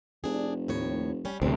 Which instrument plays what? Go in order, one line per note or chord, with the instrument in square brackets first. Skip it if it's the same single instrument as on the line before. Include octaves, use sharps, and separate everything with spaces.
[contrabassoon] F1 [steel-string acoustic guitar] D4 G#4
[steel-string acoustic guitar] D#2 A2 C#5
G3 C#4
[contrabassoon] D1 [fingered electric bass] D2 C3 [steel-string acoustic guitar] C4